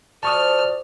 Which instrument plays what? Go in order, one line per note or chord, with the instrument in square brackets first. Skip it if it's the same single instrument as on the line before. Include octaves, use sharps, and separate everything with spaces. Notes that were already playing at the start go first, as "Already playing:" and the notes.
[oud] F3 [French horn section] F#4 A4 D5 [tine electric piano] A5 C#6 D#6 [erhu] F6